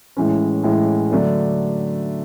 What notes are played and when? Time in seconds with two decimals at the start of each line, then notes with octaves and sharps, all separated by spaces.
0.17 A2 E3 G#3 C#4
0.63 A2 E3 G#3 C#4
1.11 D3 F#3 A3 D4